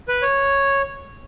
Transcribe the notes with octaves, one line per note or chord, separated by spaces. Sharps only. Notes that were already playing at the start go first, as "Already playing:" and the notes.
B4
C#5